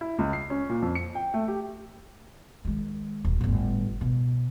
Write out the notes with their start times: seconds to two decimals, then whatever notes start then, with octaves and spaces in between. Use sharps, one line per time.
0.01 E4
0.19 C#2
0.33 C7
0.50 C#4
0.69 A#2
0.82 F2
0.95 C#7
1.15 G5
1.34 A3
1.48 G4
2.65 D#3 G#3
3.25 D#1
3.41 G1 A2
4.01 B2